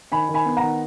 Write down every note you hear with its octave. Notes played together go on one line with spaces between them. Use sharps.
D#3 G#5 B5
D#3
G#5 B5
B3
F#5 A#5
D#3